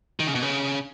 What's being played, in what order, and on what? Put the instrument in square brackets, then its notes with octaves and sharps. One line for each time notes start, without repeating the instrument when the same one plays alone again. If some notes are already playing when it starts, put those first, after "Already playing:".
[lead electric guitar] D#3
C#3
B2
C#3